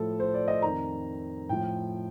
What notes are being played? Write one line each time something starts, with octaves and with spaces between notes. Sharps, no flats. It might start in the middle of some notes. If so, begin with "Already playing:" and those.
Already playing: A2 F3 A4
C5
D5
D#5
F2 D#3 A#5
A2 F3 G5